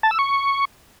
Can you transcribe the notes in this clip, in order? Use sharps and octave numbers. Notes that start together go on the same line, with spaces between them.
A5
E6
C#6